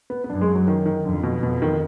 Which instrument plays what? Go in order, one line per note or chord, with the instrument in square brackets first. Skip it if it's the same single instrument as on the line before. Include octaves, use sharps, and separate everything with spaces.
[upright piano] B3
B3
[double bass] F#2 [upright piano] D4
[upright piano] G#3
F#3
D#3
D#3
[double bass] F2 [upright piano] D3
[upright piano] B2
[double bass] F2 [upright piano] B2
[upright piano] D#3